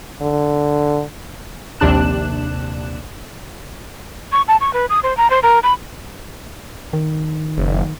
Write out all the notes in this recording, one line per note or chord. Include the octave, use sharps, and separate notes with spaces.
D3
A#1 D#2 C3 D4 F#6 E7
C#6
A5
C#6
B4
D#6
C5
A#5
C5
A#4
B5
D#3
F#1